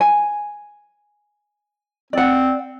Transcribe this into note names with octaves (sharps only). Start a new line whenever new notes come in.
G#5
C4 D5 F#5